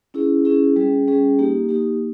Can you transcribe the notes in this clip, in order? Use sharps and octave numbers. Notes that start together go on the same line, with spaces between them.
C#4 E4 G#4
C#4 E4 G#4
G3 C#4 G#4
G3 C#4 G#4
A#3 D#4 G4
A#3 D#4 G4